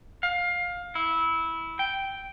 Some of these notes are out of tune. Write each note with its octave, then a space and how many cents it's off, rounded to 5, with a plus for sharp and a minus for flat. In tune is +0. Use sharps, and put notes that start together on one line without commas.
F5 +20
E4 -15
G5 -5